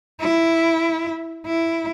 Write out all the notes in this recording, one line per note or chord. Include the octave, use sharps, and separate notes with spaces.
E4
E4